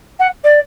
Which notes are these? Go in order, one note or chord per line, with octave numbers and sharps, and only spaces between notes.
F#5
D5